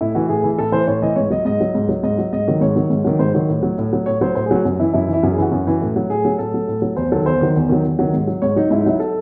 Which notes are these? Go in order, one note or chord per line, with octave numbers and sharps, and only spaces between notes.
A2 E4
E3 F#4
A2 G#4
E3
A2 A4
E3 C5
A2 C#5
E3 D#5
G#2 C#5
F#3 D#5
G#2 D#5
F#3
G#2
F#3
G#2 D#5
F#3
G#2 D#5
D#3 F#3
G#2 C#5
D#3 F#3
G#2
D#3 F#3
G#2 C5
D#3 F#3 C#5
A2
F#3
A2
F#3
A2 C#5
F#3 C5
A2 C5
G#4
F#3 F#4
F#2
E3 E4
F#2 E4
E3 E4
F#2 F#4
G#4
E3 F#4
F#2
E3
A2
F#3
A2 G#4
F#3
A2 A4
F#3
A2
F#3
E2 C5
D#3 F#3 A4
E2 C5
D#3 F#3
E2
D#3 F#3
E2
D#3 F#3
G#2
F#3
G#2 C#5
F#3 D#4
G#2 E4
D#4
F#3 E4
A4